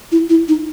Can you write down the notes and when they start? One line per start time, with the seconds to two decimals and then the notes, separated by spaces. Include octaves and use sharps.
0.12 E4
0.30 E4
0.48 D#4